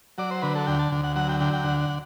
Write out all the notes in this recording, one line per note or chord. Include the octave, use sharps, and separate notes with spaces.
F#3 D5
C5
D3 B4
A4
D2 G5
A5
D2
F#5
F#3 F#5
G5
D3 G5
G5
D2 F#5
F#5